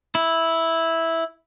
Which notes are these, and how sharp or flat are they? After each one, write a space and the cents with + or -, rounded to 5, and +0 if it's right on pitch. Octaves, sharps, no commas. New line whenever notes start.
E4 -5